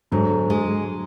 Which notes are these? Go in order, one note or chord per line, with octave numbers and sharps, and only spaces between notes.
G#2 D3 F#3
G#3